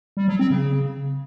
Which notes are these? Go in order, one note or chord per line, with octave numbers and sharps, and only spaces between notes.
G3
F#3
C4
C#3